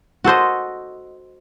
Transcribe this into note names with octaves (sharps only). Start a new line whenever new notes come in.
F#4 A4 C5 D#5